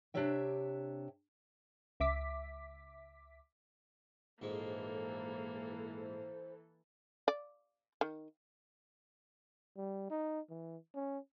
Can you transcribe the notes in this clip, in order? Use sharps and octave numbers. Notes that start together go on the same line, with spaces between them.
C3 D4 G4 C#5 E5 G5
C#2 E5 D6 B6
A#1 G#2 E3 G#3 A#3 A4 C5
C5
D5
D#3
G3
D#4
E3
C#4